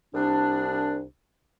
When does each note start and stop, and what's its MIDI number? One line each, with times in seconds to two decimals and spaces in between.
0.14 1.02 36
0.14 1.02 62